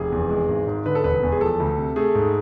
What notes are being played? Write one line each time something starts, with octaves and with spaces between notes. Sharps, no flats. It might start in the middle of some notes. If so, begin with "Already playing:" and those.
Already playing: F1 G#4
E2
G#3
G#1
G#2
D3 B4
A4
E1 B4
E2
G#4
F3 A4
D2
C3
A3 G#4
G#2